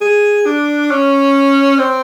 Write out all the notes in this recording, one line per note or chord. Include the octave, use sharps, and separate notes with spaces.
G#4
D4
C#4
C4